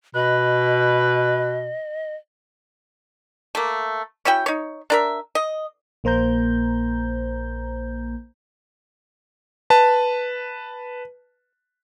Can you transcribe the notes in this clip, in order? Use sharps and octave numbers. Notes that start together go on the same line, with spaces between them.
B2 B4 D#5
A3 A#3
C#4 E4 F#4 G5
D#4 C#5
D4 A#4 E5
D#5
A#1 A#3 C5 A#5 G6
B4 A5